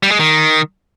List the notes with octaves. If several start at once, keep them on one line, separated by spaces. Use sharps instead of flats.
G3
G#3
D#3